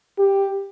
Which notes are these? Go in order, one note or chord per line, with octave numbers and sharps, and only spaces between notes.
G4